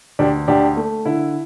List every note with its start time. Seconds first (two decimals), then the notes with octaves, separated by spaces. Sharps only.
0.19 D2 D4 G4
0.48 D2 D4 G4
0.77 A3
1.05 D3 E4